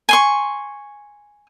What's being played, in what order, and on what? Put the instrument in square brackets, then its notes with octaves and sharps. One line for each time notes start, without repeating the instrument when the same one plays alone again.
[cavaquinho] G#5 C6 C#6